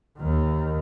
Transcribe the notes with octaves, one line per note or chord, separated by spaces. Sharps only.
D#2 D#3